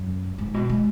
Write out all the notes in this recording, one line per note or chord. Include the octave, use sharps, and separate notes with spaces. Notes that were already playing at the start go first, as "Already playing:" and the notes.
Already playing: F#2
G#2
B2
G#3